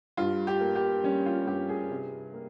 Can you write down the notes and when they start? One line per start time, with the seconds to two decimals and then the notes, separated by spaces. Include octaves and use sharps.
0.17 G2 F4
0.47 G4
0.61 A#3
0.76 G4
1.04 G3 C#4
1.26 F4
1.47 G2 G4
1.69 G#4
1.90 C3
2.34 A#3